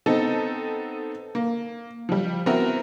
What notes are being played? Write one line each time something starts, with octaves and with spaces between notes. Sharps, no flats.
B3 C4 D#4 A4
A#3
F3 G3
B3 C4 E4 F#4 A#4